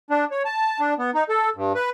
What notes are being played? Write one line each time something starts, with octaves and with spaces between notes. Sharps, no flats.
D4
C#5
A5
D4
B3
D#4
A4
G2
B4